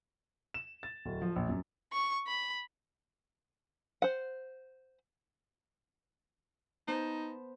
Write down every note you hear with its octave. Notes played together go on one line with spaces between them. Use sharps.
E7
A6
D1
F3
A#1
F#2
C#6
B5
C5 F#5
B3 D#4 C5 A5